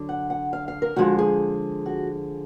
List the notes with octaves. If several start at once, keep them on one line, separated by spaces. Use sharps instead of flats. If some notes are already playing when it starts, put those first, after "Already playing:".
Already playing: D3 F#3
F#5
F#5
F5
F5
A#4
D3 F3 G#3 F#4
G#4
F#4